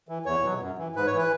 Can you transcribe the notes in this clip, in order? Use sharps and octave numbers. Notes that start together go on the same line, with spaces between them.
E3
E2 C#5
B2 F#3
F#2
E3
G#2 B4
C#5
E3 B4